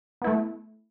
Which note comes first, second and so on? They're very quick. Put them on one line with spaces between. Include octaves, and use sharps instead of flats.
B3 E4 A3